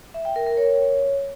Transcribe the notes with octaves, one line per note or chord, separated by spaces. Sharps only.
E5
G5
A#4
A#4
C#5